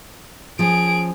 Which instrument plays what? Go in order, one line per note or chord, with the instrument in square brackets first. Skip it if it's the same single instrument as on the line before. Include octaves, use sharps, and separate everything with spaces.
[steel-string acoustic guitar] F3 C#4 [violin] G#4 D7